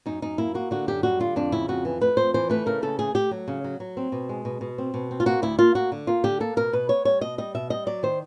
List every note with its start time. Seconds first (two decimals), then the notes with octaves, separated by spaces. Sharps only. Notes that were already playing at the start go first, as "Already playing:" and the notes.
0.06 F#2 D#4
0.22 F#2 D#4
0.38 A#3 E4
0.54 A#3 F#4
0.71 D3 F#4
0.88 F#2 G4
1.03 G3 F#4
1.20 D3 F4
1.36 F2 D4
1.52 C#3 E4
1.68 F2 F#4
1.85 E3
2.01 A3 B4
2.17 F2 C5
2.34 E3 C5
2.50 A3 B4
2.66 C#3 A#4
2.82 C#3 A4
2.99 A3 G#4
3.15 A3 G4
3.31 F#3
3.48 C#3
3.64 F#3
3.80 F#3
3.97 C4
4.12 B2
4.29 G#3
4.45 B2
4.61 B2
4.78 C4
4.94 B2
5.11 C4
5.20 F4
5.26 A#3 F#4
5.42 D2 E4
5.59 A#3 F4
5.75 A#3 F#4
5.92 D3
6.07 A#3 F4
6.24 D3 G4
6.40 A#3 A4
6.56 B2 A#4
6.73 B2 B4
6.89 B3 C#5
7.05 G3 C#5
7.21 B2 D#5
7.38 G3 D#5
7.55 B2 E5
7.70 G3 D#5
7.87 F#3 D5
8.03 D#3 C5